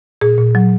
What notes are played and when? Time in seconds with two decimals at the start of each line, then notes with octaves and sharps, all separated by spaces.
0.21 A#2 G#4
0.38 A#2
0.55 F#3